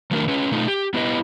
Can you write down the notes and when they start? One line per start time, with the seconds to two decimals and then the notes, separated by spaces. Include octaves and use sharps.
0.11 D#3 F#3 A3 D4 G#4 A#4
0.28 C#4 G#4 B4 C#5
0.51 B2 A3 D#4 F4
0.68 G4
0.94 B3 D4 E4 G4 B4 D#5